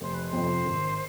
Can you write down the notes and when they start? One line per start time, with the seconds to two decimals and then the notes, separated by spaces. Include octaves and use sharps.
0.01 F1 C5
0.13 B4
0.26 C5
0.33 F2 C3
0.66 G#1